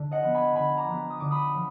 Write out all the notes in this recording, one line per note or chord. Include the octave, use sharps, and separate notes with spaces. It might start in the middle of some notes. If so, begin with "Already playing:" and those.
Already playing: D3
D#5 F#5
F3 B3
G#5 B5
D3 G#5 B5
A#5 D6
F3 B3
D#6
D3 D6
B5 D#6
F3